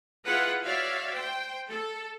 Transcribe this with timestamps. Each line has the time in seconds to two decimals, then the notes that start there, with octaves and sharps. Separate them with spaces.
0.25 E4 F4 G#4 B4 F#5
0.63 F#4 C#5 D5 E5 F5
1.14 C5 G5
1.69 A4